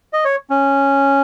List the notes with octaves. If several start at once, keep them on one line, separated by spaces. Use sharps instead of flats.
D#5
C#5
C#4